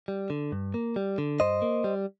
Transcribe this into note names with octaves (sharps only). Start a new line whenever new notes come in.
G3
D3
G2
A#3
G3
D3
G2 C5 D#5
A#3
G3